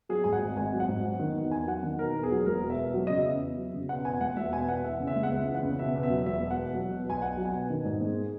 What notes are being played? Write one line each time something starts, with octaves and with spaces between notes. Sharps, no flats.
F#3 G#4
G#2 G#5
F#5
G#1
G#1 G#5
F#3
F#5
G#2
F#3
D#3
E2
E2 G#5
F#3 F#5
D#3
B2 A#4
E2
G#4
F#3
E1 A#4
B2
E5
E2
F#3
C#3 D#5
E5
E2
E2
F#3
C#3
B2 F#5
E2 G#5
E1 F#5
E1 E5
B2 G#5
E2 F#5
E3 E5
C#3
E5
G#3
F#5
C#2 E5
E3
F#5
C#3
B2 E5
E2
E5
F#3
E1 E5
B2
F#5
E2
F#3
B2
B1 G#5
B1 F#5
F#3
G#5
B2
D#3
G#2
G#3